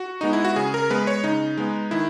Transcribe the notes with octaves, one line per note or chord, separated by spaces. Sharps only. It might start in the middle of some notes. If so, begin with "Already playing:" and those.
Already playing: F#4
G#3 B3 D#4
E4
F#4
C#3 G#4
A#4
G#3 B3 B4
C#5
C#3 D#4
G#3 B3
D#3 E4